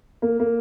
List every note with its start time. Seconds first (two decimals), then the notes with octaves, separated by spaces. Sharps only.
0.22 A#3
0.40 A#3